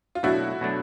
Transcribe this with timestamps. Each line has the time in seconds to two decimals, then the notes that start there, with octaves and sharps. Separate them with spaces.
0.15 F4
0.23 B2 F#3 A3 D4 E4 F#4
0.61 B2 F#3 A3 D4